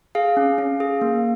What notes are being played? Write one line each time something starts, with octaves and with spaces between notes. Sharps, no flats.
G#4 F5
C#4
C#4
G#4
A#3